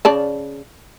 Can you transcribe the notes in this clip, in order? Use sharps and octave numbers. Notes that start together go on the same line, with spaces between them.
C#3 D5 A5